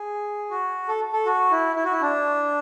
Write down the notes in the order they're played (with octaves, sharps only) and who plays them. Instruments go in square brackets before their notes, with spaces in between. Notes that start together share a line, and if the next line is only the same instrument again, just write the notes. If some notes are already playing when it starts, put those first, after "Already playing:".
Already playing: [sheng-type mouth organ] G#4
F#4
A4
A4
F#4
E4
E4
F#4
E4
D4